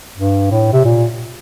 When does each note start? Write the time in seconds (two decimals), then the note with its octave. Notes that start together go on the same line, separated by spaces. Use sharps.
0.18 G2
0.51 A2
0.73 C3
0.85 A#2